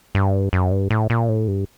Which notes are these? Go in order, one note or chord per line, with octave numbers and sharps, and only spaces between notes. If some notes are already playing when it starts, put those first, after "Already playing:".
G2
F#2
G2
A2
A#2
A2
G2